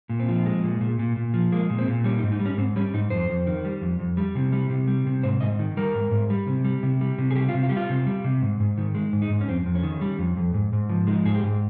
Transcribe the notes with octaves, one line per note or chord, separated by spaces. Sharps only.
A#2
C4
F3
G#3
A#2
A#2
A#2
A#2
F3
G#3 A#3
A#2
C4
A#2
G3 C#4
D#4
G#2
D#4
G3
C#4
G#2 C4
G3 C#4
G#2 D#4
F2 C5
F2
D#3
G3
F2
F2
G3
C3
G3
C3
G3
C3
G#2 C5
G#2 D#5
D#3
G3 A#4
G#2
G#2
G3
C3
G3
C3
G3
C3
G#4
G3 G4
F4
C3
F4
G3 G4
F4
C3
G3
C3
G#2
G#2
D#3
G#3
G#2
D#4
G#2
C#4
F2 C4
F2
C#4
D#3
G3
F2
F2
G#2
G#2
F3
G#3 D#4
G#2 G#4
G4
G#2